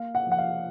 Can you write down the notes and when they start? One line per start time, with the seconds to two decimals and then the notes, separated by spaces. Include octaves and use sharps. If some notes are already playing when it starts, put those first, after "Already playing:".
Already playing: A#3 F5
0.15 F#5
0.27 F3 F#5
0.38 F5